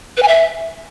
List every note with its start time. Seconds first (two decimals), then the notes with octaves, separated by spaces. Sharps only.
0.17 B4
0.23 G#5
0.28 E5